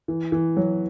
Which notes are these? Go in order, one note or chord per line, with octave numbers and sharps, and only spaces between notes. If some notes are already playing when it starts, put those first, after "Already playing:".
E3
E3
F#3